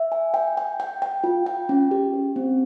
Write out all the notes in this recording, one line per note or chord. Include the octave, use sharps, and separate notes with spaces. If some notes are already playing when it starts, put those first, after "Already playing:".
Already playing: E5
G#5
G5
G5
G5
G5
F4
G5
C#4
G4
G4
C4